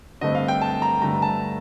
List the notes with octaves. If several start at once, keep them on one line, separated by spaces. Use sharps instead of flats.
G2 D3 A3 C4 D#5
F5
G5
A5
A#5
G2 D3 A3 A#5
A5